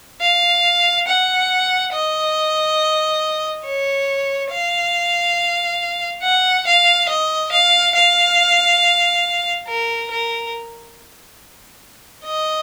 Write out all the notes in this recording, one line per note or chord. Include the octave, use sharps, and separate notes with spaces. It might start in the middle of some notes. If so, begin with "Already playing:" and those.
F5
F#5
D#5
C#5
F5
F#5
F5
D#5
F5
F5
A#4
A#4
D#5